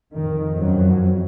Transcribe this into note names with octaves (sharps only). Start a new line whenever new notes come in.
F2 D#3
F#2 F#3